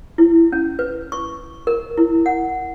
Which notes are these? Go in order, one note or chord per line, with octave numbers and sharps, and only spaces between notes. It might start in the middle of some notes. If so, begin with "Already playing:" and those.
E4
C#4
B4
C#6
A#4
E4
F#5